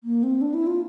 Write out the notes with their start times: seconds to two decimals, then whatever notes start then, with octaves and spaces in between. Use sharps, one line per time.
0.04 A#3
0.23 C4
0.41 D4
0.54 E4
0.67 F4